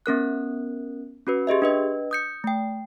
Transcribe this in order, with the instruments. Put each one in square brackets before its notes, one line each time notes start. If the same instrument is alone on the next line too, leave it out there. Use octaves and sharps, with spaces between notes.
[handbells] B3 C#4 A#4 F#6
C#4 F#4 B4
G4 G#4 D#5 E5
D4 B4 D#5
D#6 G6 C#7
A3 G5